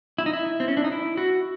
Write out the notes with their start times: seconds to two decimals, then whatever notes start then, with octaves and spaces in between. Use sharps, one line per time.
0.18 E4
0.26 D#4
0.33 E4
0.60 C4
0.68 C#4
0.77 D4
0.84 D#4
0.92 E4
1.17 F#4